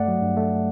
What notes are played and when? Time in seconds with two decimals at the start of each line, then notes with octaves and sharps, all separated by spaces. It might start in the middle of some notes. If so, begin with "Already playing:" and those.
Already playing: G2 A3 D5 F#5
0.08 F#3
0.22 G2
0.37 A3